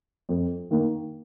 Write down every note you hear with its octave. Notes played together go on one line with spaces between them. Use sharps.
F2
D#3 A#3